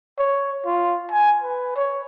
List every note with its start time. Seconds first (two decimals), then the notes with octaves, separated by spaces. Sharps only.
0.18 C#5
0.66 F4
1.11 G#5
1.42 B4
1.75 C#5